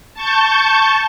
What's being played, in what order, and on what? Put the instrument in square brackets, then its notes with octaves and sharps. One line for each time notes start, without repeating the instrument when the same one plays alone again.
[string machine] A5 C#6 G6